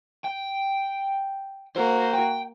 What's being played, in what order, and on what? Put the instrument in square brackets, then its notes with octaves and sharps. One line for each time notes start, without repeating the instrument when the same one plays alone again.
[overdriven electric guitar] G5
[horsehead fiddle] A#3 F#4 [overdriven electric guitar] C5
[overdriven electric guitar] G5